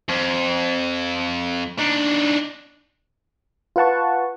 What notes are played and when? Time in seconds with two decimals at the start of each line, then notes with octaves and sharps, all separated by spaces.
0.09 F2
1.79 D4 D#4
3.76 F4 B4 F#5 A5 C#6